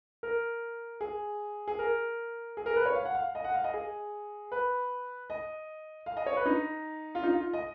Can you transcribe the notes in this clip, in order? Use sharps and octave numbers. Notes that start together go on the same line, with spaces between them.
A#4
G#4
G#4
A#4
G#4
A#4
B4
C#5
F5
F#5
F5
D#5
F#5
F5
D#5
G#4
B4
D#5
F5
D#5
C#5
B4
D#4
F4
D#4
F4
D#5